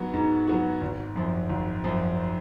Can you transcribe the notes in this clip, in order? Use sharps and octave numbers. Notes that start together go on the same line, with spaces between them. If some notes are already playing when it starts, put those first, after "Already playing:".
Already playing: G#2 F#3 B3 F#4
G#2
F#3 B3 F#4
G#1
F#2 F3
G#1
F#2 F3